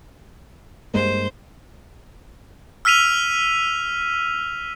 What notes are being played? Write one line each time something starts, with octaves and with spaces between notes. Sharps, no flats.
G2 G#3 A#3 C5
E6 F6 B6 D#7 F7